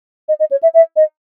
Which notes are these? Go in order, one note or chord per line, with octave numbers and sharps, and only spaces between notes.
D#5
D#5
C#5
E5
E5
D#5